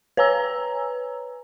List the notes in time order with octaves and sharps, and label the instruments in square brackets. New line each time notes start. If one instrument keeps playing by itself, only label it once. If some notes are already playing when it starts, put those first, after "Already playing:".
[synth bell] B4 C#5 G#5 A#5 E6